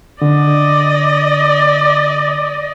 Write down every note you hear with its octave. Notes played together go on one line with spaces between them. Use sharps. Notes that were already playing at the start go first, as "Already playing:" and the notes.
D3 D5 D#5